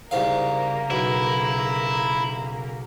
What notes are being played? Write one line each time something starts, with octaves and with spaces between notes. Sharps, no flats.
C2 G#2 C#3 A#3 A#4 F5
B1 E4